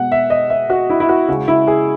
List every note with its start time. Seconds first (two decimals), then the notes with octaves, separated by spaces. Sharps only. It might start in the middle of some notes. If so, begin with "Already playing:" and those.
Already playing: B2 G#3 F#5
0.12 E5
0.30 D#5
0.50 E5
0.70 F#4
0.90 E4
1.00 E4
1.09 F#4
1.28 C#3 G#3 F#4
1.48 E4
1.67 G#4